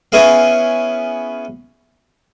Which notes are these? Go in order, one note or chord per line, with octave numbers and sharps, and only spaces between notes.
B3 C#4 E4 G#4 E5 F5